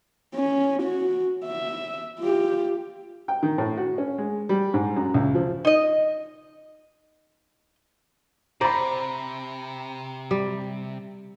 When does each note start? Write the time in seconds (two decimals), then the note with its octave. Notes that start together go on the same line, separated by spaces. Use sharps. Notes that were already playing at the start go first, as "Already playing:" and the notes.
0.35 C#4
0.83 F#4
1.45 E5
2.20 F4 G4
3.28 G5
3.43 D#3
3.58 A2
3.77 F#4
3.98 C#4
4.18 G#3
4.49 G3
4.74 G#2
4.96 F#2
5.14 C#2
5.35 F3
5.65 D#4 D#5
8.61 C3 C5 D5 A#5 B5
10.31 G3